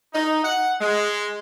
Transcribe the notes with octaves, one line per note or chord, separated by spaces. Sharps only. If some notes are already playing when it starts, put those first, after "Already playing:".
D#4
F#5
G#3